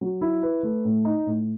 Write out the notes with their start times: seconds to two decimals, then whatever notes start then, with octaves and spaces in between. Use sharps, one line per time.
0.01 F#3
0.21 E4
0.43 B4
0.63 A3
0.85 A2
1.05 D#4
1.26 A2